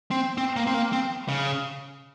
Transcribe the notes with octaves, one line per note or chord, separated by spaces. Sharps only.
C4
C4
A#3
C4
A#3
C4
C#3